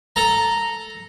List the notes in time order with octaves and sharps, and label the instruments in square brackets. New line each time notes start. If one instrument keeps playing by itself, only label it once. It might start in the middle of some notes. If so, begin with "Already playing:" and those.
[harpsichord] A4 A#5